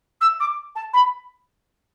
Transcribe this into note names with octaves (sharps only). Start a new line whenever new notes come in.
E6
D6
A5
B5